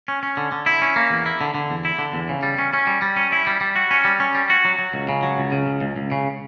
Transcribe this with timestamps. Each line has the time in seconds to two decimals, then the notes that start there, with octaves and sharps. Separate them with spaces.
0.08 C#4
0.23 C#4
0.37 D3
0.52 D3
0.66 E4
0.82 C#4
0.96 A#3
1.11 E2
1.26 E4
1.41 D3
1.55 D3
1.70 E2
1.85 E4
1.99 D3
2.14 E2
2.29 C#3
2.43 G3
2.58 C#4
2.73 C#4
2.87 G3
3.02 G3
3.16 C#4
3.32 E4
3.47 G3
3.61 G3
3.76 F#4
3.91 C#4
4.05 G3
4.20 C#4
4.35 G3
4.50 F#4
4.65 F#3
4.79 F#3
4.94 C#2
5.09 C#3
5.23 F#3
5.38 C#2
5.52 C#3
5.67 C#2
5.81 C#2
5.96 C#2
6.12 C#3